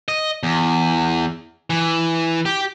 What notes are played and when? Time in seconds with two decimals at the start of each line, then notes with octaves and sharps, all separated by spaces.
0.08 D#5
0.43 E2
1.70 E3
2.46 G4